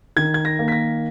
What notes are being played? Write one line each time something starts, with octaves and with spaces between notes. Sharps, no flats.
D#3 G#6
G#6
A#6
A#3
B6
A#6